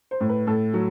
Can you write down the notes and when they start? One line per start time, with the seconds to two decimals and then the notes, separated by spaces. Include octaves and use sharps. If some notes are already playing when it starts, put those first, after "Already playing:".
0.11 C5
0.21 A2
0.29 B4
0.47 A2 A4
0.74 F#3